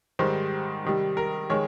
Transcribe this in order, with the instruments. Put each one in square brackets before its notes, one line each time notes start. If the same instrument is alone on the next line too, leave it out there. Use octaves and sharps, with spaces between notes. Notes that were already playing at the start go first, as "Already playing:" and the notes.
[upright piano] G#2 D#3 G3 C5
C3 D#3 G3
A#4
D#3 G#3 C#5